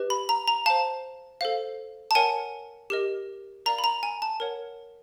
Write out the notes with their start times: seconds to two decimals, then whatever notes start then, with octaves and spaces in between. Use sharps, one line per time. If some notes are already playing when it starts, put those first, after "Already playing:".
Already playing: G4 B4 D#5
0.10 B5
0.29 A#5
0.47 A#5
0.66 C5 F5 A5
1.41 A4 C5 F5
2.11 A5
2.15 A#4 C#5 F#5 G#5
2.90 G4 A#4 D#5
3.66 A#4 D5 F5 A#5
3.79 B5
3.84 A#5
4.03 G#5
4.22 A5
4.40 A#4 C#5 F#5